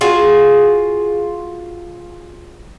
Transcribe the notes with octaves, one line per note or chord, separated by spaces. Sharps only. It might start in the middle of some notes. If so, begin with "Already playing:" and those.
F4 F#4 G#4